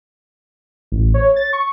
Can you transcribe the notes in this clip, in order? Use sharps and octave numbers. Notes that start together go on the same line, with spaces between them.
A1
C#5
A6
C#6